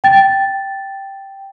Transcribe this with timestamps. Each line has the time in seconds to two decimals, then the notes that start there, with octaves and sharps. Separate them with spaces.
0.04 G5 A6